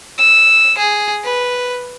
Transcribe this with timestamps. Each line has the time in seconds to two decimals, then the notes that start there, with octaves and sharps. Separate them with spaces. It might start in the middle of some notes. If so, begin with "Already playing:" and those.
0.18 E6
0.78 G#4
1.24 B4